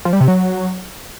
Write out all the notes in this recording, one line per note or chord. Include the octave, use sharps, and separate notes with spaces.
F3
G3
C3
F#3